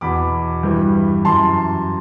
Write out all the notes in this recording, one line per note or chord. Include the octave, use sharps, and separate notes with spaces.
E2 B2 B5 D6
G2 E3
F#2 E3 A5 C6